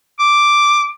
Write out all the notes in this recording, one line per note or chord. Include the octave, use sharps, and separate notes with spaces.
D6